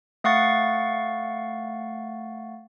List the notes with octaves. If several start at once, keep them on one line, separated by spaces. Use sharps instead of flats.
A3 F5 F#5 C#6 A6